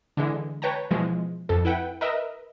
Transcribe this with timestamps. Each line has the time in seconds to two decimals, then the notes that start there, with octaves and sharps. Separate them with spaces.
0.17 D3 E3 G#3
0.62 B4 C#5 G5 A5 A#5
0.91 B2 E3 F3 G#3
1.49 F2 A4
1.65 E4 B4 F#5 G5
2.01 A#4 B4 D#5 E5